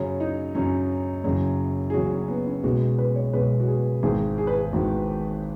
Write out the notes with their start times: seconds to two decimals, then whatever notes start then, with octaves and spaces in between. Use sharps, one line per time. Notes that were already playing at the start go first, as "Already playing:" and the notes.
Already playing: F#2 C#3 F#3 C#4
0.20 D#4
0.55 F#2 C#3 F#3 C#4
1.24 F#1 F#2 C#3 F#3
1.90 G#4
1.94 F#1 F#2 C#3 F#3 F#4
2.11 C#4
2.28 B3
2.46 C#4
2.63 B1 B2 G#3 F#4
2.99 B4
3.15 C#5
3.33 B1 B2 G#3 B4
3.60 F#4
3.68 G#4
4.03 G#1 G#2 D#3 G#4
4.38 G#4
4.47 B4
4.57 G#4
4.72 G#1 G#2 D#3 F#4